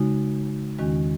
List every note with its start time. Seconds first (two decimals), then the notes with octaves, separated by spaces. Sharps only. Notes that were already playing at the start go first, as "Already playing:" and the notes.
Already playing: C#3 G#3 D#4 F#4
0.79 E2 D#3 G#3 C#4 F#4